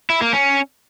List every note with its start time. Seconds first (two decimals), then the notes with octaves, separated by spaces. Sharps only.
0.10 E4
0.21 A#3
0.33 C#4